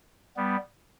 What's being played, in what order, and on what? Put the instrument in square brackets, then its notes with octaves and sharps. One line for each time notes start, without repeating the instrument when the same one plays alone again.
[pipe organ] G3 B3